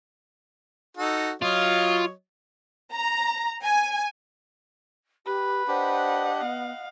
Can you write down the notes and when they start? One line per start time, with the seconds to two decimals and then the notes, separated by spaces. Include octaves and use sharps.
0.97 D#4 F#4 A4
1.42 F#3 F4 C#5 D#5
2.92 A#5
3.63 G#5
5.26 G4 B4
5.68 D4 G4 C5 D#5 F#5
6.40 B3 F5